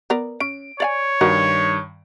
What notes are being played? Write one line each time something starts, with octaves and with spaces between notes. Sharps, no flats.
B3 A#4 D5
C#4 D7
C#5 D5 F5 G#5
G2 D#3 F#4 A#4 D#5